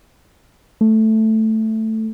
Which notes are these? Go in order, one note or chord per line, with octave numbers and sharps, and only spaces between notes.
A3